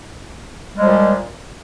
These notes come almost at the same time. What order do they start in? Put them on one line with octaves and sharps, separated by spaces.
G3 G#3 F3 A#2